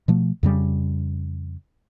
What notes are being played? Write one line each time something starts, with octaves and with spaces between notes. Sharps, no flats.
B2 F3 A3
F2 C#3 G3